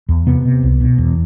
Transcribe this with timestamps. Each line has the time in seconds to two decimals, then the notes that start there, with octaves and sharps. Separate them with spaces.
0.09 E2
0.27 C3 B3
0.45 C3
0.63 C2
0.81 B2
0.98 E2